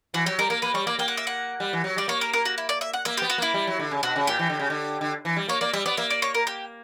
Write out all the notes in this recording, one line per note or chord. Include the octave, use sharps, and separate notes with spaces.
E3 F#4
F#3 G4
G3 A#4
A#3 A#4
A#3 B4
G3 C#5
A#3 D5
A#3 G5
F#5
E5
F#5
G3
E3
F#3
G3 D5
A#3 C#5
A#4
A#4
F#4
E4
D5
E5
F#5
A#3 E5
G4
B3
F#4
A#3 E4
G3
F#3
D3
C#3
B2 F#4
C#3
A#2 G4
E3
D3
C#3
D3
D3
E3
G3
A#3 C#5
A#3 D5
G3 E5
B3 D5
A#3 E5
D5
C#5
A#4
G4